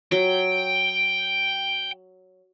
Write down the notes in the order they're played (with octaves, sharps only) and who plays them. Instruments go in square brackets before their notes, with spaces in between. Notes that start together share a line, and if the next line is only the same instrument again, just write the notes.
[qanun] F#3 [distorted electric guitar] G5